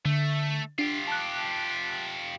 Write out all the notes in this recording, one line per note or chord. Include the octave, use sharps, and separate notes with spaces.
D3 A3
D4 F4 G4
A5 F#6